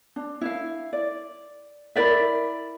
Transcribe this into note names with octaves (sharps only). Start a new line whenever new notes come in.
D4
E4 F5
D5
E4 A#4 D5 E5